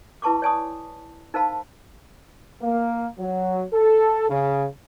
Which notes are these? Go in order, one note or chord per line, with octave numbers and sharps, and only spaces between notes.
E4 B4 A5 C#6 D6
C#5 D5 G#5 A5 C#6 D#6
D#4 A#4 C5 F5 A5 B5
A#3
F#3
A4
C#3